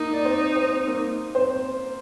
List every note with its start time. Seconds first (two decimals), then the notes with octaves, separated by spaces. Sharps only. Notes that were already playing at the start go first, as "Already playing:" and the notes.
Already playing: A#3 D#4 A#4
0.13 D5
0.25 C4 C5
0.56 C4 C5
0.87 A#3 A#4
1.35 C4 C5